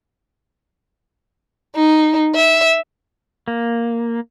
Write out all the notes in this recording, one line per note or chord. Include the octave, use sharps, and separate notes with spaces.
D#4
E5
A#3